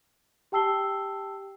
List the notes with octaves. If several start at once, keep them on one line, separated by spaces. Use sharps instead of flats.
G4 G5 A5 E6 C7 G7